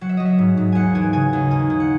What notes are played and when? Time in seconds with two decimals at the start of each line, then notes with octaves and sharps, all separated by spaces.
0.01 F#3 F#5
0.09 E5
0.17 F#3 D#5
0.25 E5
0.39 G#2
0.57 G#2
0.72 D#2 F#5 G#5
0.95 E3 G#5
1.13 C#3 G#5
1.33 D#2
1.51 D#3 G#5
1.70 D#3
1.80 F#5